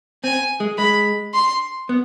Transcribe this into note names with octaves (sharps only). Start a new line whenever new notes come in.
C4 G#5
G#3
G#3 B5
C6
B3